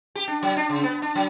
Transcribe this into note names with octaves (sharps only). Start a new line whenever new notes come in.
G4
D4
F#3
D4
C#3
B3
D4
F#3